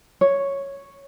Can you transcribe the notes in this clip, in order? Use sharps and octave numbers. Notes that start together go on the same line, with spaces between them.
C#5